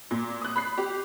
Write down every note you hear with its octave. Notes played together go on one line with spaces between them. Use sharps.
A#2
D#6 F#6
B5 F#6 C7
G4